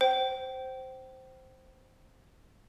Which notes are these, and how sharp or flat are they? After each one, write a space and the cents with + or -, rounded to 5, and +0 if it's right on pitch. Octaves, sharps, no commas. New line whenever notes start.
C5 +0 G5 -30